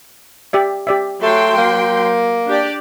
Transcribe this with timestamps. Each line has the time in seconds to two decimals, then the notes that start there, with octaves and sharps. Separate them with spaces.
0.53 G4 D5 E5
0.87 G4 D5 E5
1.22 F#3 A3 G5 C6
1.57 A#3
2.47 D4 G4 D5